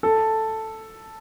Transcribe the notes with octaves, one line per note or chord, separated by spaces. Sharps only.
A4